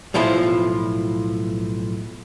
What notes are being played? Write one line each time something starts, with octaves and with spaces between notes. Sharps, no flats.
B1 A2 F3 E4 F4 A5